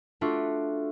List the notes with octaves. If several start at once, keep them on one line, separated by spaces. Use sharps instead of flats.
A3 D4 F4 F#4